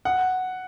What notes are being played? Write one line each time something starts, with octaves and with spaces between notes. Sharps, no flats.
F#5